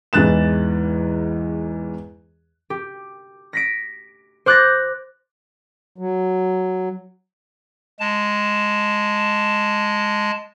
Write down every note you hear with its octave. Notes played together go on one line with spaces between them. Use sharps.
E2 G#2 E3 F#6 A6 E7
G4
A#6 B6 D7
C5 D6 F#6 G6 A6 A#6
F#3
G#3 A5